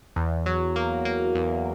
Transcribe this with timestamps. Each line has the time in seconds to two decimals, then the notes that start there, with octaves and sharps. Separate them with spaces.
0.16 E2
0.46 F#3
0.76 A#3
1.05 A#3
1.35 E2